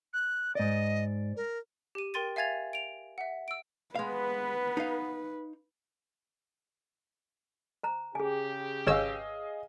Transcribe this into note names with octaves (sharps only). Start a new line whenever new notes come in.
F#6
G#2 D5 D#5
A#4
G4 D#7
A#4 G5 C6 A6 D#7
E5 F5 G#5 G#6 A6 F7
D7 F7
E5 F#5
E6 D7
G#3 B3 B4 F5
D#4 F5
C5 A#5
C#3 G4 G#4 G#5
G#1 G#4 B4 C#5 D#5 F5 E6